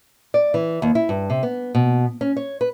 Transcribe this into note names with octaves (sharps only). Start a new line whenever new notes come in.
D5
E3
D#2
E4
G2
C3
B3
B2
C#4
C#5
B4